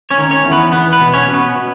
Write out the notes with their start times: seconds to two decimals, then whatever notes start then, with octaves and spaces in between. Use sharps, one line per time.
0.11 C#4 C#5
0.18 D#3
0.31 C#4 C#5
0.45 E2
0.52 B3 B4
0.72 E2 B3 B4
0.93 B3 B4
1.01 B2
1.14 C#4 C#5
1.28 B2
1.34 B3 B4
1.56 B2